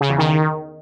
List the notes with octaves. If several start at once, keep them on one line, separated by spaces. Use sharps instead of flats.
C#3
E2
D#3